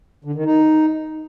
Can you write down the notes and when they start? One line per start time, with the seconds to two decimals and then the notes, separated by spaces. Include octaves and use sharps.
0.25 D3
0.35 D#3
0.46 D#4